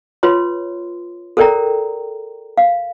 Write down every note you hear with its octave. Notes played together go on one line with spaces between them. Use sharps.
F4 B4 C#5 C6
A4 A#4 C5 D5 G5 A#5
F5